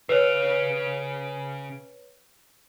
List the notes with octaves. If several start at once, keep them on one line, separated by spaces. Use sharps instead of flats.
C#3 B4 C#5 F5